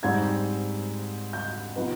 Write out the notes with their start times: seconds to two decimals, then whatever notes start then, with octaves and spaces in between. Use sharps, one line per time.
0.03 G#2 G3 C4 D#4 G#6
1.33 G6
1.76 C3 F3 B3 D#4